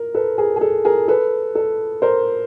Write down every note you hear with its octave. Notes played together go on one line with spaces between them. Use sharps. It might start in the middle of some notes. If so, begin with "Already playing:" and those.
Already playing: A#4
A4 B4
G#4 A#4
G#4
A4
G#4 A#4
A4 B4
A4
A#4 C5